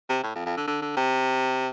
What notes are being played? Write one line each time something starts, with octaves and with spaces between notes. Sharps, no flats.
C3
A2
F2
F2
D3
D3
D3
C3